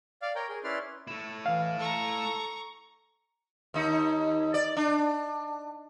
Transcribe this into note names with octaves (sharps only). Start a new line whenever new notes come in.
D5 F5
A#4 C#5 G5 A#5
G#4 A#4
C#4 E4 B4 D5 C6 F6
A3 E4
E3 F5
A4 A#5 C#6
D#2 D#4
D5
D4